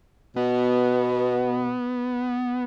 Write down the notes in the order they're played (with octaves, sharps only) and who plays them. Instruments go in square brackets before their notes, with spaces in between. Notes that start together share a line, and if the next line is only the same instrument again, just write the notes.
[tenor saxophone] B2 [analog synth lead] B3